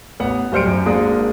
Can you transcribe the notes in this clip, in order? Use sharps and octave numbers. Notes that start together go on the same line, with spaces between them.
A1 B3 F#5
D1 G3 C5 F6 C#7 D7
F#2
G#1 G#3 A#3 D4 D#6